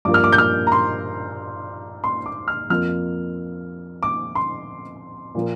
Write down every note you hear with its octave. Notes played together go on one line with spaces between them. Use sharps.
G2 F3 A#3 D6
F6
D6
G6
F6
A#5
C6
C6
D6
F6
F2 F3 A#3 F6
D6
C6
A#2 F3 A#3